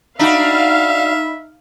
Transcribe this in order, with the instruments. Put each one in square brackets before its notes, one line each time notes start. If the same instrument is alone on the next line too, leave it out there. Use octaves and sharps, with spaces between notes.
[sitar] D4 F#4 [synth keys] D#4 B5 [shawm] E5 [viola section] F5